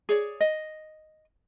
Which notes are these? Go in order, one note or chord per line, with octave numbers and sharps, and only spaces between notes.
G#4 C#5 D5
D#5